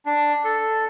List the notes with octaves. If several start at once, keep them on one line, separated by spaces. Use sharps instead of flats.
D4
A4